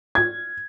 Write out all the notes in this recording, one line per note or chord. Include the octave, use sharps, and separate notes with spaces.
G#6